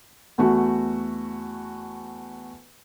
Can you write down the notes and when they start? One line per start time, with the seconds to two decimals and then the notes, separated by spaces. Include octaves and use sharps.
0.38 E2 A3 F#4